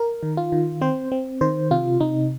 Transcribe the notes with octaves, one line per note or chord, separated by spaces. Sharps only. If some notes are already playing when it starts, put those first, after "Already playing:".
Already playing: A#4
D#3
F4
D#3
C4 C5
C4
D#3 C5
C3 F4
C3 D#4